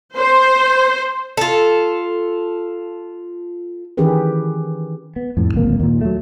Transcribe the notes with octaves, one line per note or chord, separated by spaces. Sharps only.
C5
F4 A4
D#3 E3 C#4 G4 G#4 B4
B3
F2 A2
D1 G#1 A#3
D#2 A#2
F#3 A3